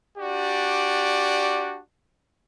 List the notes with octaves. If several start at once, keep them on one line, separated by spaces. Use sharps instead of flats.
D4 F#4 G4 D5